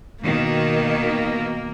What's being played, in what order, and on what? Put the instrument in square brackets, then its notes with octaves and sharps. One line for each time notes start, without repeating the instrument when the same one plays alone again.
[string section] B2 D#3 [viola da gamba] A#3